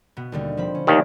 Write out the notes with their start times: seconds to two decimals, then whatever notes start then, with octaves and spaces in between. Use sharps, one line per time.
0.17 B2 B3
0.32 D#2 D3 G3
0.57 F3 C4 B5
0.75 C#4
0.87 D#2 D#3 A3 D5